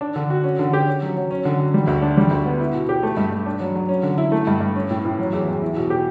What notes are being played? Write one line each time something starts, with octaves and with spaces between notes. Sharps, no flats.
D4
D3
F#4
C#4
D3
G4
C#4
F#3
F#3
C#4
D3
F#4
G3
D2
D4
G3
D2
B3
E4
B2
G4
A3
G2
G2
D4
F#3
F#3
C#4
D3
E4
A3
G2
G2
C#4
A2
A2
F#3
E2
E2
E4
B2
G4